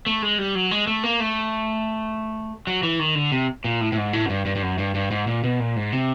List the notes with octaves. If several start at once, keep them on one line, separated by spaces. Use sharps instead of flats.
A3
G#3
G3
F#3
G#3
A3
A#3
A3
F#3
E3
D#3
D3
C3
A#2
A2
A2
G#2
A2
F#2
G2
G2
G2
F#2
G2
G2
G#2
A#2
B2
A#2
G#2
C3